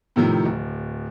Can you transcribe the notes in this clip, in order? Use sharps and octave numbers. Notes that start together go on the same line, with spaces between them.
A2 C3 D#3 F3
D1